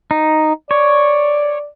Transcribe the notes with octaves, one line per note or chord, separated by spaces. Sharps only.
D#4
C#5 D5